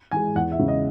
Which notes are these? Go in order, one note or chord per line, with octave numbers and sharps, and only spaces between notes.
E3 G#3 G#5
E2 F#5
E5
C#3 G#3
D#5